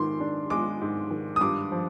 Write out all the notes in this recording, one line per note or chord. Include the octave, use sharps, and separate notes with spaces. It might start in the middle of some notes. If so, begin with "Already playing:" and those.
Already playing: G#2 D#3 C6 D6
D4
G#3 D6
G#2
D#3
D#6
G2 D6
F3